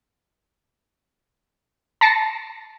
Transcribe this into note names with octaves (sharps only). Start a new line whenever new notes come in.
A5 A6 A#6 C7 C#7